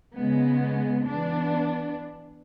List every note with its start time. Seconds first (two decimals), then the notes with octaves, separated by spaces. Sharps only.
0.14 C#3 G#3 B3
1.06 E3 B3 D4